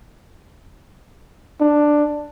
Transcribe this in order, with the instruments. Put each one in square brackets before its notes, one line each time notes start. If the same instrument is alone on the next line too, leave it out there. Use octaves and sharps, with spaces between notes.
[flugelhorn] D4